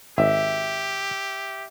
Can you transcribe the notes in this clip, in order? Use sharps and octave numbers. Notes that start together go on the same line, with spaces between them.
G#1 G4 E5